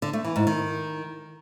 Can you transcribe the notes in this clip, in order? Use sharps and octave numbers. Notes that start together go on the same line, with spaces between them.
D3
A3
E3
G#2
D#3